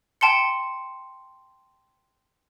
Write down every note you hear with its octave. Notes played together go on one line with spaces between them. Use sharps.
G5 A5 C6 C#7